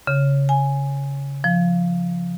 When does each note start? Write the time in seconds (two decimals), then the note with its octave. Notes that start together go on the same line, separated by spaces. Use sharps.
0.07 C#3
0.49 G#5
1.44 F3